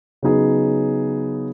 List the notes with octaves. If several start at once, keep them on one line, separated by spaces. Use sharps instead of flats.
C#3 F#3 B3 D#4 G#4